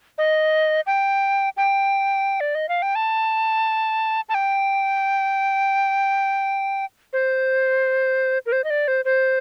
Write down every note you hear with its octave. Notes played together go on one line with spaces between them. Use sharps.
D#5
G5
G5
D5
D#5
F5
G5
A5
A5
G5
C5
A#4
C5
D#5
D5
C5
C5